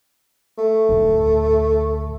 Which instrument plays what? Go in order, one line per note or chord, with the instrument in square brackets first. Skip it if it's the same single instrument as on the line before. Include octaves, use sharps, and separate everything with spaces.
[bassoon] A3
[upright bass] D2 A2